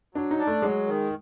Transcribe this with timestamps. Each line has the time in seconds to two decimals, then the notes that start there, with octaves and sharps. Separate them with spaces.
0.15 F#3 D4
0.31 D#4
0.39 D4
0.47 A3
0.62 F#3 G#3
0.87 D#3